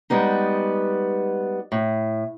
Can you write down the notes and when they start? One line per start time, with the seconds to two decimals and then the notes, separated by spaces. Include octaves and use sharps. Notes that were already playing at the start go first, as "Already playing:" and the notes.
0.10 G3 G#3 B3 D#4
1.72 A2